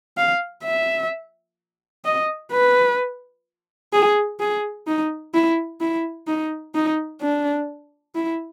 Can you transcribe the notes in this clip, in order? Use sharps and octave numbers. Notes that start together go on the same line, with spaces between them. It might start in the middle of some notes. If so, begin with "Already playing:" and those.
F5
E5
D#5
B4
G#4
G#4
D#4
E4
E4
D#4
D#4
D4
E4